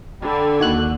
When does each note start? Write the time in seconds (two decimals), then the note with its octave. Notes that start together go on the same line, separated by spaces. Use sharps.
0.22 D3 A4 G5 B5
0.60 D#2 D#3 A#3 F#4 F#6 G#6